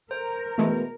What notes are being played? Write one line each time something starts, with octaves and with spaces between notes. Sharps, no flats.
A#4 C5
B2 E3 G#3 A3